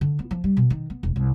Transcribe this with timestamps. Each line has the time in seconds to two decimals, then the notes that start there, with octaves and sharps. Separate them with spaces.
0.01 D3
0.19 B3
0.31 F3
0.44 G3
0.57 B2
0.70 D#3
0.90 B3
1.03 E1
1.16 C2